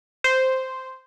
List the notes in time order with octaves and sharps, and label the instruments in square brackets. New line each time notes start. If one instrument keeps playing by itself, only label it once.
[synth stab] C5